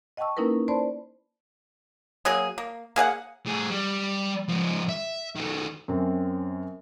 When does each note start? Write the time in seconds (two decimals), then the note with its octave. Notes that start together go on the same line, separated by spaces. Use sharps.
0.17 D#5 F#5 G5 A5 C#6 E6
0.37 A#3 C#4 D#4 E4 A#4 B4
0.68 C5 D5 A5 B5 C6
2.25 F#3 A#3 G#4
2.58 A#3
2.96 A#3 G#4 F5 F#5
3.46 A2 G#4
3.70 G3
4.48 G#2 F3
4.89 E5
5.36 D#3 A3
5.88 F#2 C4 C#4